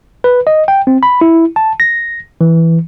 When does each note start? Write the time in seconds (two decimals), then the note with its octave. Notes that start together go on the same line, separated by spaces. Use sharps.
0.24 B4
0.47 D#5
0.68 G5
0.87 C4
1.03 B5
1.21 E4
1.56 A5
1.80 A#6
2.41 E3